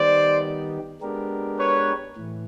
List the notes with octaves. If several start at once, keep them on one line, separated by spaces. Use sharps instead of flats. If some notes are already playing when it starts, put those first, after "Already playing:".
Already playing: D#3 G3 B3 D#4 G4 C5 D5
G#3 B3 D4 G4 A#4
B4 C#5
A2 E3